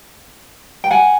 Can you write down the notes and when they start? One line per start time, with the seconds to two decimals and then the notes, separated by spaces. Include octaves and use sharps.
0.84 G5
0.91 F#5 G#5